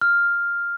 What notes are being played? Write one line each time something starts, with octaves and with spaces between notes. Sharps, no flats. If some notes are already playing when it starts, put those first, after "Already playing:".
F6